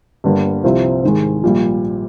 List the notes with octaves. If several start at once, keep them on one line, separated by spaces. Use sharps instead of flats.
G1 G2 D3 G3 A#3
C2 C3 F3 C4 F4
G#2 D#3 G#3
A#1 A#2 G3